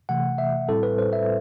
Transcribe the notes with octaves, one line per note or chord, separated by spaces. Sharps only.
C3 E3 A3 F#5
E5
A2 G3 C4 E4 A4
B4
C5
E5